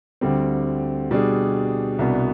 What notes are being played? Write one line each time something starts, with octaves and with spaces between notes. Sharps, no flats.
D2 D3 G3 C4
B2 G3 D4 G#4
C2 B2 B3 D4